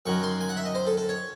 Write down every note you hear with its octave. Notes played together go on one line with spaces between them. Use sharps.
F#2 D#3 F#3 C#6
C6
G#5
F#5
E5
D#5
C5
A4
A4
C#5